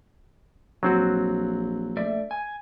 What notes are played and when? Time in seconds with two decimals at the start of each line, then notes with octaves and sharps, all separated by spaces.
0.83 A#1 F#3 C4 F#4
1.97 A3 D5 E5
2.31 G#5